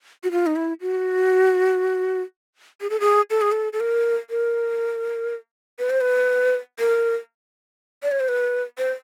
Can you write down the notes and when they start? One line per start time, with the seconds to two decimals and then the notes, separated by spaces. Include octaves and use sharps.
0.24 F#4
0.31 F4
0.46 D#4
0.56 E4
0.81 F#4
2.81 G#4
2.90 A4
3.00 G#4
3.30 A4
3.41 G#4
3.52 A4
3.73 A4
3.80 A#4
4.30 A#4
5.79 B4
5.90 C5
6.01 B4
6.80 A#4
8.03 D5
8.12 C#5
8.20 C5
8.29 B4
8.78 C5